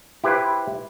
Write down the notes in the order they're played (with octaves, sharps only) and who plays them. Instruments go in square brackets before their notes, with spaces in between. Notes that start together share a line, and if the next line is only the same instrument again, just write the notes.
[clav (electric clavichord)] E4 G4 B4 C5